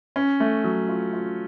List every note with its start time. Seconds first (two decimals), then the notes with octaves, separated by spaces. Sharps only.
0.16 C#4
0.40 A3
0.64 F#3
0.89 F4
1.13 F4